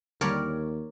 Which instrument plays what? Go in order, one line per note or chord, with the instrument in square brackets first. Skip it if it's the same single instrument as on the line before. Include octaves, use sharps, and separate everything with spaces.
[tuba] D#2 [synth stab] D3 G3 [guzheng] A#4 C#5 D5